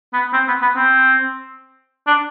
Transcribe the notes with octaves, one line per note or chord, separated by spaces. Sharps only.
B3
C4
B3
B3
C4
D4